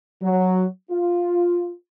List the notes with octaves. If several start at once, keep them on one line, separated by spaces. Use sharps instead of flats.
F#3
F4